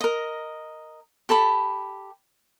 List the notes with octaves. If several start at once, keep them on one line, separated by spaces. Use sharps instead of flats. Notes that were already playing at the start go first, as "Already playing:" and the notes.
A#4 D#5
G4 A4 A5 B5